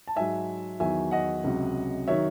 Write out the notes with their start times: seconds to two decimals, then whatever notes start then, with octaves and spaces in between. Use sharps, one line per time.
0.08 A5
0.16 G#2 F#3 E5 G#5
0.80 E2 D#3 F#3 E5 G#5
1.11 D#5 F#5
1.44 C#2 C3 F#3
2.08 D#3 F#3 C#5 E5